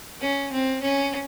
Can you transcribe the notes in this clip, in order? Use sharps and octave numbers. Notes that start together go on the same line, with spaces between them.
C#4
C4
C#4